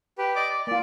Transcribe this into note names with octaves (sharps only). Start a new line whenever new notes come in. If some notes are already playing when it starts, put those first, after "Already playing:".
G4 B4
D5 D#5 D6
D5
A#3 F4 D5